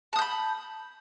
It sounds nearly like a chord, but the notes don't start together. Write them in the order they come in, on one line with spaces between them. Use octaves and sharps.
A5 D#6 G6 B5